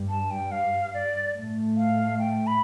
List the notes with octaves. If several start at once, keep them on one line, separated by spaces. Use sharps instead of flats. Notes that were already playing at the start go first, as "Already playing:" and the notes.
Already playing: G2 G3
A5
G5
F5
D5
A2 A3
F5
G5
B5